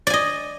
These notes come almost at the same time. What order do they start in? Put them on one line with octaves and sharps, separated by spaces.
D5 G#5 D#5